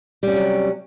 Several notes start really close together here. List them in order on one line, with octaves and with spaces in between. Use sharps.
G3 C#4 C3 F#3